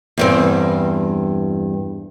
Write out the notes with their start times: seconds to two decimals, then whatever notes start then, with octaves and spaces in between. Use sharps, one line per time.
0.18 E2 G2 C4